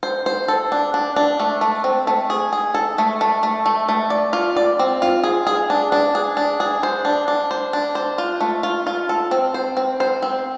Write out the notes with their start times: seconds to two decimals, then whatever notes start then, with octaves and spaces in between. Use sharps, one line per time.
0.03 C5
0.26 C5
0.48 A4
0.72 D4
0.94 D4
1.16 D4
1.40 A3
1.61 A3
1.84 C4
2.07 A3
2.30 G#4
2.53 G#4
2.74 A4
2.98 A3
3.21 A3
3.43 A3
3.66 A3
3.89 A3
4.10 D5
4.33 F4
4.56 D5
4.79 C4
5.02 F4
5.23 G#4
5.47 G#4
5.70 D4
5.92 D4
6.15 G#4
6.37 D4
6.60 G#4
6.83 C5
7.05 D4
7.28 D4
7.51 C5
7.73 D4
7.95 C5
8.18 F4
8.40 A3
8.63 F4
8.87 F4
9.09 A4
9.31 C4
9.54 C5
9.77 C4
10.00 C5
10.22 C4